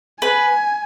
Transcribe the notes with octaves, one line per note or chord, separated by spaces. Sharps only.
B4 G#5